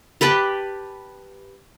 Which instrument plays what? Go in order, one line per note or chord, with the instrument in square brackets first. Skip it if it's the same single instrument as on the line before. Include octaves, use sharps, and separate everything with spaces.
[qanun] G4 B4 G5 A5